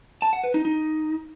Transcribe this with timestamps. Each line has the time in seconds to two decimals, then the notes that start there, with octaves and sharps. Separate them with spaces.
0.22 A5
0.33 F#5
0.44 B4
0.54 D#4
0.65 D#4